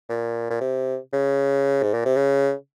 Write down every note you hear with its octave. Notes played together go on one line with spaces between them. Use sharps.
A#2
A#2
C3
C#3
G#2
A#2
C3
C#3